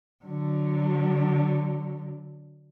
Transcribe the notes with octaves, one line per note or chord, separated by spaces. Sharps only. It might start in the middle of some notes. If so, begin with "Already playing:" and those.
D3 F#3